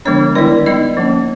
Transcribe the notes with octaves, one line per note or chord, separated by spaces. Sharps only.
D3 F3 G#3 B3 D4 C#5
D#3 G3 B3 E4 D5
G3 B3 D#4 D#5
F3 A#3 C#4